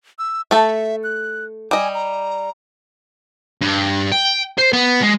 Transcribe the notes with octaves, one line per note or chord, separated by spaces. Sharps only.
E6
A3 A4 E5
F#6
G3 D#5 G#5
A#5
G2
G5
C5
B3
G#3